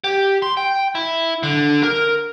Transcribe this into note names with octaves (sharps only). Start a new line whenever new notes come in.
G4
C6
G5
E4
D3
A#4